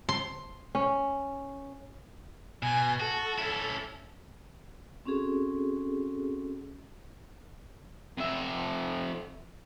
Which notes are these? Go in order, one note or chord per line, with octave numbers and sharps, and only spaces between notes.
C6
C#4
B2 G#5
F#4 A4
C#4 E4
C4 C#4 F#4 G#4 A4
F2 E5